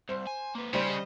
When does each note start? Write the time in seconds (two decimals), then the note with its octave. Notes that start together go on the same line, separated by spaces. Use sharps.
0.09 C2 C5
0.27 G#5
0.55 A#3 B4
0.73 C#3 G3 D#4 G4 C5
0.90 D#5